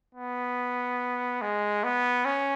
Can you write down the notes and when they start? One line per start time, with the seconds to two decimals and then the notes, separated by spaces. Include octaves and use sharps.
0.15 B3
1.41 G#3
1.84 B3
2.25 C#4